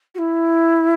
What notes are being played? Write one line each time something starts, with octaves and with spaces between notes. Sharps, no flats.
F#4
E4